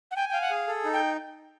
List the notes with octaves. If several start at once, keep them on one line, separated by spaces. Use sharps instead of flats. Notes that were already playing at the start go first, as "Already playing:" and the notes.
F#5
G5 G#5
F5 G5
F#5
G#4
A4
D#4
G5